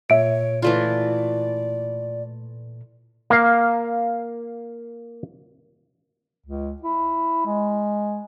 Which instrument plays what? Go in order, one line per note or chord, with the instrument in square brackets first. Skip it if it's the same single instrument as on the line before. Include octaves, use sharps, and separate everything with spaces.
[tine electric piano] A#2 [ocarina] C#5 [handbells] E5 D7
[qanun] E3 A3 F4 [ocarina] D5
[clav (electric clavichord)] A#3 F5
[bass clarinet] C#2
E4
G#3